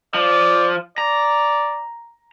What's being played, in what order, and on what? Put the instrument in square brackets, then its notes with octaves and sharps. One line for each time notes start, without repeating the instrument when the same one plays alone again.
[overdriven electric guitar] F3 [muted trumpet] D5
[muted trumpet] D5 [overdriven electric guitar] A#5